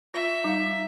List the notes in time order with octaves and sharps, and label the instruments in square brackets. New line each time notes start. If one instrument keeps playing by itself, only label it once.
[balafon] F4 [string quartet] E5 [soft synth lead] A#6
[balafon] G3 F5 [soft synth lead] D#4